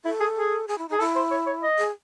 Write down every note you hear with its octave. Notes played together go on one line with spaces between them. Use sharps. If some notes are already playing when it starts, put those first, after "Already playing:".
E4 A4
G#4
G#4
G#4
E4
D#4 G#4
E4 A4
C5
C#5
C#5
D#5
G#4